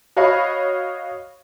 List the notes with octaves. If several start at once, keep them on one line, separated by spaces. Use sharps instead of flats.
F#4 C#5 D#5 F5 B5